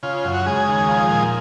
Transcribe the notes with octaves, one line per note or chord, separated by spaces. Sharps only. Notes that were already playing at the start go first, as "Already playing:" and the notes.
C#3 F4
F#2
F#4
C#3 G#3 G#4
D#2
F3
A#2